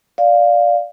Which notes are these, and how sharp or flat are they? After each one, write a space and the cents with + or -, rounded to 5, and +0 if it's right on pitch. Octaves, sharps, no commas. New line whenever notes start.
D5 +0 F5 +0